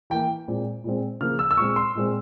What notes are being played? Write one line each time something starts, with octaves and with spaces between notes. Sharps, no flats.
E3 A#3 G5
A#2 G#3 C4
A#2 G#3 C4
C#3 F3 A#3 F6
E6
E6
A#2 G#3 C4 C#6
C6
A#2 G#3 C4